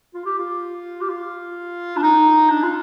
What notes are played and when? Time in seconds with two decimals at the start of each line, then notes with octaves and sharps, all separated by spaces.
0.14 F4
0.25 G4
0.39 F4
1.01 G4
1.09 F4
1.97 D4
2.03 D#4
2.50 D4
2.63 F4